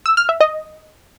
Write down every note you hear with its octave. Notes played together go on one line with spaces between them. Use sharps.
E6
F6
E5
D#5